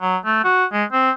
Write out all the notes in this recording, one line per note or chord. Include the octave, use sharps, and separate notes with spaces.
F#3
A3
F#4
G#3
C4